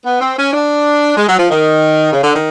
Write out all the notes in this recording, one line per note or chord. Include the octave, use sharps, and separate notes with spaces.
B3
C4
C#4
D4
G#3
F#3
F3
D#3
C#3
D3
D#3